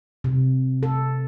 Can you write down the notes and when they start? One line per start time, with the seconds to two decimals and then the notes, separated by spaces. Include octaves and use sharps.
0.24 C3
0.83 A4